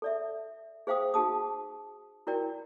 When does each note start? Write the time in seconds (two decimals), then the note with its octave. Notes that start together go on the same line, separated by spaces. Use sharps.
0.02 A4 D5 E5
0.87 G#4 C5 F5 G5 D#6
1.14 D#4 F#4 G#4 A5 D#6
2.27 E4 F#4 A#4 D5 G5